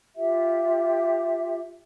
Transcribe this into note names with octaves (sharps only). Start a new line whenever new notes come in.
F4 G4 E5